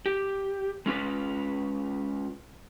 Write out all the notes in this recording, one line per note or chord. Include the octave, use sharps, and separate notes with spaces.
G4
G#3 C#4 F4 B4